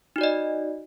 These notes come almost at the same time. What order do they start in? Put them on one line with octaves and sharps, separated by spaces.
D#4 F#4 D5 D#5